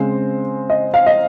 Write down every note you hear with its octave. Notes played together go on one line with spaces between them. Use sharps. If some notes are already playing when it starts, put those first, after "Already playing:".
Already playing: C#3 G#3 C4 C5
D#5
F5
D#5